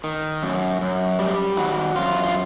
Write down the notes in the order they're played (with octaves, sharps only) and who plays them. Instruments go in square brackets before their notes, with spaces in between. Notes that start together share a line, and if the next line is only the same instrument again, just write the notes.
[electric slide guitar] D#3
F#2
F#2
G3
D#3 F#4
F#2 F4
F4